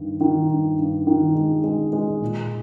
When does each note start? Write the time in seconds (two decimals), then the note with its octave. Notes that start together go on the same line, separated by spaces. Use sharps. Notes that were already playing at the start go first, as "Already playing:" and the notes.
Already playing: G2 D#3
0.21 D#3
0.50 G2
0.78 G2
1.07 D#3
1.35 G#3
1.64 G#3
1.93 G#3
2.22 A#2